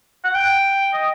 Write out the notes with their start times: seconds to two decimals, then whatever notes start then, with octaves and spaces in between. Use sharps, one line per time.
0.24 F#5
0.35 G5
0.93 D#5